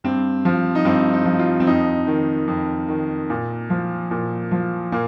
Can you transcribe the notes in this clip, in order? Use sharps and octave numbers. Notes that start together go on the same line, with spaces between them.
G2 C4
F3
D#4
G2 C4
D#4
F3
F4
C4
F2 D#4
D#3
F2
D#3
A#2
F3
A#2
F3
A#2 A#3